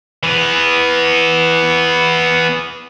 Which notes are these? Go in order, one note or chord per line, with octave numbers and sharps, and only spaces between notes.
E3 B3